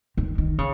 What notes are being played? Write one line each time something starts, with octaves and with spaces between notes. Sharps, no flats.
D#3
D#3
C#3